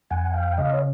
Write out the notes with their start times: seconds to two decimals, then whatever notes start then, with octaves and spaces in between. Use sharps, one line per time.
0.10 F2 F#5 G#5
0.34 F5 G5
0.58 C#3 D#5 F5
0.73 C#5